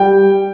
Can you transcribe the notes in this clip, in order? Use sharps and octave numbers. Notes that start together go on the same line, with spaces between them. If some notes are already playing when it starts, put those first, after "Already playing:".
Already playing: G3 G5